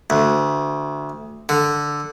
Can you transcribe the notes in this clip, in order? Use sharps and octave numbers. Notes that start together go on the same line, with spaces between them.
D2
D3